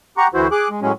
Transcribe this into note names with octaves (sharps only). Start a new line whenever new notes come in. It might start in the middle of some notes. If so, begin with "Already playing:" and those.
G4 F#5 A#5 C#6
D2 E3 E4 F#4 C5
G#4 D6 F#6
G#3
A2 F#3 G#3 C#4